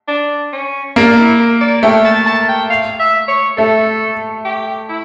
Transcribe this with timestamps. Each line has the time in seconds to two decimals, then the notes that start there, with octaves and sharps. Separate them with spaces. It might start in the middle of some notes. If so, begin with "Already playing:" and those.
0.08 D4
0.53 C#4
0.96 A#3 D4
1.10 D4
1.18 E4
1.40 A#4
1.61 D5
1.83 A3 G5
2.05 A5
2.26 A5
2.49 G5
2.70 F5
3.00 E5
3.28 C#5
3.57 A3 A4
4.45 G4
4.89 E4